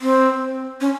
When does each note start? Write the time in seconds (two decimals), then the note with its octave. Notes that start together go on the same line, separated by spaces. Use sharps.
0.01 C4
0.81 C#4